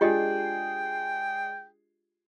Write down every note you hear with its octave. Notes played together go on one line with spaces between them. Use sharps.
G#3 D4 F4 G4 G#4 D#5 G5